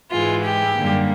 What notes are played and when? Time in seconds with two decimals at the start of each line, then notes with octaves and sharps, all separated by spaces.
0.11 G#2 E3 G#3 F4
0.44 G4
0.75 F#2 D3 G3 A#3